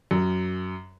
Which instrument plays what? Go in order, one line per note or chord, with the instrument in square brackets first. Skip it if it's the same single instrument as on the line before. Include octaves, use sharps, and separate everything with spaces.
[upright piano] F#2